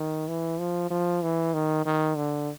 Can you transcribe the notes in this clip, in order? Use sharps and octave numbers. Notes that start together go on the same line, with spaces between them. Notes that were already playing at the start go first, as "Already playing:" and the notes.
Already playing: D#3
E3
F3
F3
E3
D#3
D#3
D3